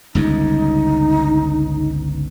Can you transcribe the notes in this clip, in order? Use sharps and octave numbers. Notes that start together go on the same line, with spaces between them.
G1 C#2 G2 D#4